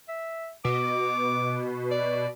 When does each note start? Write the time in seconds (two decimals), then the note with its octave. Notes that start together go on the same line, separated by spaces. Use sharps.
0.08 E5
0.65 B2 D6
1.91 D5